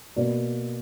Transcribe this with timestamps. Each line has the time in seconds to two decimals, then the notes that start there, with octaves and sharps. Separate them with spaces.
0.16 B2 A#3 D5